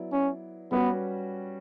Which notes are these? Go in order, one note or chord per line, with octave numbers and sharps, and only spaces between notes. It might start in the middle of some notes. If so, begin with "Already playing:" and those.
Already playing: F#3 B3 E4 D5
C#4
G3 B3 C#4 F#4 B4